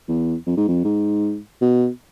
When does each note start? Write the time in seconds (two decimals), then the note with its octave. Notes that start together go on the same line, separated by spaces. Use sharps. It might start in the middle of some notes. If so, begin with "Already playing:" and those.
0.08 E2
0.47 F2
0.57 G#2
0.68 F2
0.84 G#2
1.61 B2